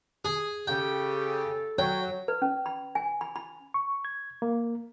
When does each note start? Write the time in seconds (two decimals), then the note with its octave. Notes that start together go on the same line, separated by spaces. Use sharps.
0.25 G#4
0.67 C#3 G4 A4 G5
1.78 F#3 C#5 G5
2.28 B4
2.42 C#4
2.66 B5
2.95 G#5
3.21 B5
3.36 B5
3.74 C#6
4.05 G#6
4.42 A#3